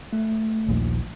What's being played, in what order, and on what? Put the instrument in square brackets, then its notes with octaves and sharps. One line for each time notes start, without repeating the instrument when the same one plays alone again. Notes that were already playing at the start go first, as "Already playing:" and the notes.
[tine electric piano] A3
[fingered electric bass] A#1 D#2 A#2